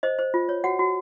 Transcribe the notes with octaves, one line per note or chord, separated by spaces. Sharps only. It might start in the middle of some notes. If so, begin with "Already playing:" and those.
C5 D#5
C5
F4
C#5
F#4 F#5
F#4